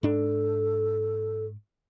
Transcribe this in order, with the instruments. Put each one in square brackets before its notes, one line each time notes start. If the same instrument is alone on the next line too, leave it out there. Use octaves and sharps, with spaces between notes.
[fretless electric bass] G#2 D4 [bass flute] A4